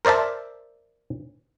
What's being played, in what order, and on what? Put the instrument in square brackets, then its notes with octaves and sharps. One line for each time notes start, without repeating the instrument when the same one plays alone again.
[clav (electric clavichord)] A#4 C5 D5 E5 A5